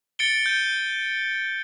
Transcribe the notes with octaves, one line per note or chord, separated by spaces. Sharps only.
A6 C#7 D7 G7
G6 D#7